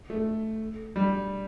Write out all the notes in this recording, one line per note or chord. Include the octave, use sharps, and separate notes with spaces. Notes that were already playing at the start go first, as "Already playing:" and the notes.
A3
G3